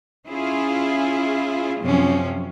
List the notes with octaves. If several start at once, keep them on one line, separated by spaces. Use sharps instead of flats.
C#4 E4 F4 G#4
F#2 C3 F3 C#4